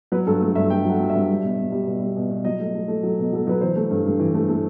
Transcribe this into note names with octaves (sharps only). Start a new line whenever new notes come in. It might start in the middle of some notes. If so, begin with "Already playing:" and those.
F#3 B4
G2 A4
A3
G2 E5
A3 G5
F#3
F#5
F#3
G2 E5
G3
B2
B2
G3
B2
G3
B2
B2
F#3 D#5
A3
A3
A3
F#3
B2
F#3 A4
F#3 B4
E3 C5
A3
G2
G2
E3
A3
A3